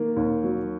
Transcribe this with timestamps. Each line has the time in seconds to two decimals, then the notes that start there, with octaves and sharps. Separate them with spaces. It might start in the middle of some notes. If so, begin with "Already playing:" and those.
Already playing: D#3 A#3
0.16 D#2
0.44 F#3